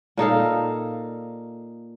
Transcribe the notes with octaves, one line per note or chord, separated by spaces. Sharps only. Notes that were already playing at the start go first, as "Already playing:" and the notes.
A#2 D#4 A4 F5